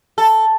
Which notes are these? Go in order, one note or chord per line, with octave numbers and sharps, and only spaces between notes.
A4